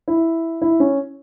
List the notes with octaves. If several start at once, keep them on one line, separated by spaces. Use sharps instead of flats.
E4
E4
C#4